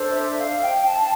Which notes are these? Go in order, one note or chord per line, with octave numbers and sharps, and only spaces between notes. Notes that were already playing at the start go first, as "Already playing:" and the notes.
Already playing: D4 A4 C5
E5
F5
G5
A5